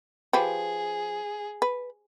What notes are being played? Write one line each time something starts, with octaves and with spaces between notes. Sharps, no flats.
F3 G4 G#4 B4
B4